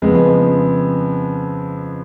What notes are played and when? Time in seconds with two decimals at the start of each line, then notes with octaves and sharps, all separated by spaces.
0.02 F2 C#3 G#3 B3